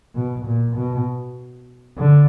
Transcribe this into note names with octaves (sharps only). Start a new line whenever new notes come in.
B2
A#2
B2
D3